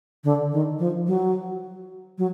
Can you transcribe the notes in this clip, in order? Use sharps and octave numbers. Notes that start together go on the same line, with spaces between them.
D3
D#3
F3
F#3
F#3